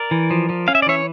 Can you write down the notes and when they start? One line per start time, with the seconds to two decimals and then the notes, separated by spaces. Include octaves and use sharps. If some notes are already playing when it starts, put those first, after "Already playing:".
Already playing: A#4 D5
0.11 E3
0.31 F3
0.49 F3
0.68 C#4 F5
0.75 E5
0.82 D5
0.86 E3 C#5 E5